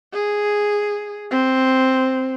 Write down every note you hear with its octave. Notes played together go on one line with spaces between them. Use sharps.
G#4
C4